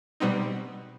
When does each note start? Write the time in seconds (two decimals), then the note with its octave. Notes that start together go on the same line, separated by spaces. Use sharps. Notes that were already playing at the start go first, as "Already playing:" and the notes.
0.20 B2 G3 B3 C4 D#4